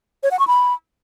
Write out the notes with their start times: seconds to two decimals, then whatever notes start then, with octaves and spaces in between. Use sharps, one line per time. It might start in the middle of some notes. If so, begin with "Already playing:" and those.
0.23 C#5
0.31 F#5
0.39 C#6
0.47 B5